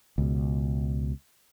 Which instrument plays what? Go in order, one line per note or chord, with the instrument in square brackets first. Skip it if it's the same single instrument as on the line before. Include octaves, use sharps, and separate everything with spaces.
[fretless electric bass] C#2 B2